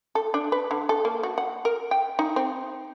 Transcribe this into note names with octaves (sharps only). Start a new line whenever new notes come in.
A4
D4
B4
D3
A4
A#3
F#4
F#5
A#4
G5
D#4
C4